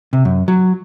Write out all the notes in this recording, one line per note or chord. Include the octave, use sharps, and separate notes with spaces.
C3
F#2
F#3